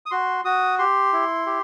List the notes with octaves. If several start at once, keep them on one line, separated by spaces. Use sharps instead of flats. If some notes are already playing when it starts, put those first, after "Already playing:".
D#6
F#4 C6
F#4 D#6
G4 C6
E4
G4